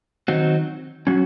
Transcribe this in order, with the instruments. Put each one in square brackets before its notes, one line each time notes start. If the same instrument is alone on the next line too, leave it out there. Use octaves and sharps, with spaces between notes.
[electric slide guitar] D#3 F#3 C4 D#4 F#4
F#3 C#4 F#4